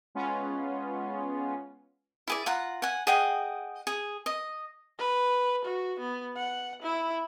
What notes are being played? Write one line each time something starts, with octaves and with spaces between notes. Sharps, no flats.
G#3 B3 C#4 F4
E4 G#4 D5
F4 F#5 A#5
F#5 G#5
G#4 D#5 F#5 G5
G#4
D#5
B4
F#4
B3
F#5
E4